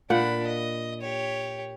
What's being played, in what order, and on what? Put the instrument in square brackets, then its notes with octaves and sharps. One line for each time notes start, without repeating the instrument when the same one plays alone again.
[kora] A#2 F#5 [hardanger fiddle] D4 B5
[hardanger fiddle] D#5
G4 C#5